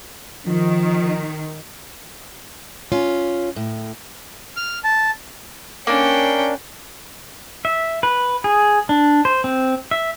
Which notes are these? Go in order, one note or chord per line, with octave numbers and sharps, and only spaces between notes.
D#3 F3
C#4 F4
A2
F6
A5
A#3 C#4 D4 G5
E5
B4
G#4
D4
C5
C4
E5